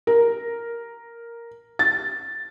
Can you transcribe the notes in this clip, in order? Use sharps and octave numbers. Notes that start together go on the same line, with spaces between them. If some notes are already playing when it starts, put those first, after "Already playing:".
A#4
A6